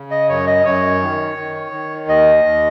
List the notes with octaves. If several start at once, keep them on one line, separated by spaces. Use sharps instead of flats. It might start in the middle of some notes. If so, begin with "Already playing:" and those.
Already playing: C#3
D#5
F#2 C#5
D#5
F#2 C#5
D#3
D#3
D#3
D#2 D#5
D#2